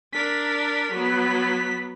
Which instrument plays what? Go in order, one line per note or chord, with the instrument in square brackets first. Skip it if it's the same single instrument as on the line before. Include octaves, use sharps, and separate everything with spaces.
[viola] D4 A#4 [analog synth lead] B6
[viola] F#3 B3